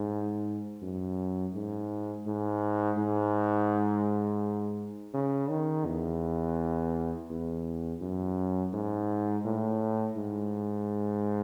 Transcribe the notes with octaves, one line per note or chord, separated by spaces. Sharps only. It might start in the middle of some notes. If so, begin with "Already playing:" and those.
Already playing: G#2
F#2
G#2
G#2
G#2
C#3
D#3
E2
E2
F#2
G#2
A2
G#2